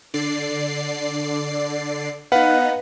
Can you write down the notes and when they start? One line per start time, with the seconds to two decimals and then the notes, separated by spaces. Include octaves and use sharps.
0.14 D3 D5 C7
2.32 B3 D#4 B4 F5 F#5